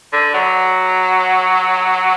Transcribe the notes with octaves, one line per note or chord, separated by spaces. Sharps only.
D3
F#3